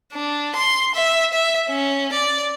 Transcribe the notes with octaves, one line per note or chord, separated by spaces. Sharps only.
D4
C6
E5
E5
C#4
D5